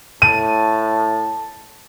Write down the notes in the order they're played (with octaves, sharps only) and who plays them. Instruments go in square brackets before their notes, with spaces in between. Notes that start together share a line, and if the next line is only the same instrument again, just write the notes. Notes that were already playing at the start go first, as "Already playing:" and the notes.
[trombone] A2 [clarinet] A5 [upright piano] D#7